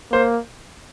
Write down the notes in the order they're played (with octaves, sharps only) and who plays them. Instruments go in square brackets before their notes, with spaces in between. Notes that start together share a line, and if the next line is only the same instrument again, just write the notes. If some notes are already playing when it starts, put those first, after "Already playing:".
[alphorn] A#3 [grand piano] C5